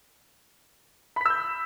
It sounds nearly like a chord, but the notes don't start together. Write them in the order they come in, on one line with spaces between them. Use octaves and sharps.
B5 B6 E6 G6